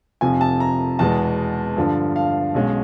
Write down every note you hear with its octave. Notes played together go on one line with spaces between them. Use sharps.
F1 F2 C3 F3 G#5
A5
A#5
E2 B2 G#3 B3 A5
G2 D3 F3
F5
B1 B2 G#3 C#4